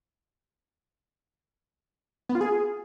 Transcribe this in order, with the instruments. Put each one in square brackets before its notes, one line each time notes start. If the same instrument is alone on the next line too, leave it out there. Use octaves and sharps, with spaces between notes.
[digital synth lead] B3
F4
G#4